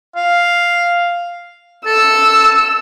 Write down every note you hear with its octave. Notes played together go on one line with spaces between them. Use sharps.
F5
A4 E6